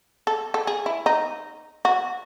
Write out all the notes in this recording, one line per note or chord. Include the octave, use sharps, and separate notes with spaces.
A4
A4
G#4
E4
D#4
F#4